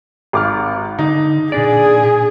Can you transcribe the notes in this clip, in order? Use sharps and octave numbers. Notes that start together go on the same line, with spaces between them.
G#1 D6 F6
D3 D#4
A#2 D4 G#4 D5